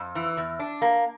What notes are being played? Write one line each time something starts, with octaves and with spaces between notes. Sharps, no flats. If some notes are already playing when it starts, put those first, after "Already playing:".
Already playing: F2
E3
E2
D4
A#3